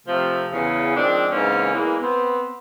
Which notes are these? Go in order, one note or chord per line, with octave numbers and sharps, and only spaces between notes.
C3 F3 A3
E2 C#3
D#3 F3 G#3 C4 D4
G#2 C#3 E3 A#3 C4 C#4
E2 E3 G#3 A#3
B3 C4